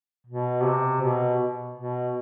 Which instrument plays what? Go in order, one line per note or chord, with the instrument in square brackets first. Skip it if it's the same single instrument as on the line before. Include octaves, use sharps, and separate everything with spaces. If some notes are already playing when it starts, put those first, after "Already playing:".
[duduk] B2
C3
B2
B2